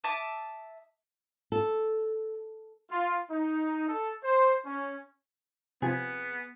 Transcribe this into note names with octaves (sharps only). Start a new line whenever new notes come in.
E5 A5 D6 D#6
A4
F4
D#4
A4
C5
C#4
C3 F3 B3 G#4